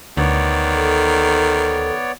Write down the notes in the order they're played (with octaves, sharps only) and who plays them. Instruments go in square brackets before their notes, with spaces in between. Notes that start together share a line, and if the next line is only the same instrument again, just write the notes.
[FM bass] D2 [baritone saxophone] D#3 [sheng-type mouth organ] B3 C#5 D5
[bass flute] A4